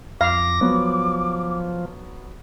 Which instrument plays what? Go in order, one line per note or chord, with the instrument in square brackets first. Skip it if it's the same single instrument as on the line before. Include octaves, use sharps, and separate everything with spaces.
[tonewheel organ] F2 A#6 [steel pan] F5 [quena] D6
[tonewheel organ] F3 [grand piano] F#3 B3